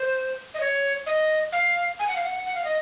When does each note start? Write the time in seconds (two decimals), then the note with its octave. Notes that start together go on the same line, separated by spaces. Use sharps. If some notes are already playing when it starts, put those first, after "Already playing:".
Already playing: C5
0.54 D#5
0.60 C#5
1.06 D#5
1.52 F5
1.99 G#5
2.08 F#5
2.16 F5
2.24 F#5
2.46 F#5
2.55 F5
2.64 D#5